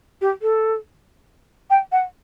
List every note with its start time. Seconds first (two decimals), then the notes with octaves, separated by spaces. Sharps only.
0.21 G4
0.42 A4
1.70 G5
1.92 F#5